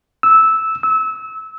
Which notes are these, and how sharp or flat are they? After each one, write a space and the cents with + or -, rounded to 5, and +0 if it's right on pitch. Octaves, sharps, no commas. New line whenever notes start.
E6 -10
E6 -25